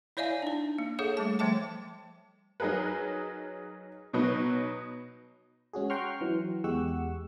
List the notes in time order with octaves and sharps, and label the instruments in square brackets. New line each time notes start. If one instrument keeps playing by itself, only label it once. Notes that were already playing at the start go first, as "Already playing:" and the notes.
[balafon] E4 C#5 D5 E5 F5 G#5
D4 D#4
A#3
G#4 A4 C#5 F#5
G3 A3 A5
F3 G3 A3 G5 A5 D6
[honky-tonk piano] F#3 D#4 G#4 A#4 B4
B2 F#3 D#4 B4
[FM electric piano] G#3 C#4 F#4 G#4
F#5 G5 A#5 C6 C#6 F6
E3 F#3
E2 G#3 G4 F#5 C#6 E6